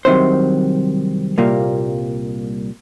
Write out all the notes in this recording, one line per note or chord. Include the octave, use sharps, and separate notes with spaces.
C2 C3 D#3 F#3 C5
C2 A#2 G3 A#3